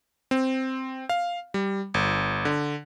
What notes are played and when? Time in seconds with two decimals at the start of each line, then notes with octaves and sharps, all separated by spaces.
0.31 C4
1.09 F5
1.54 G3
1.94 G1
2.45 D3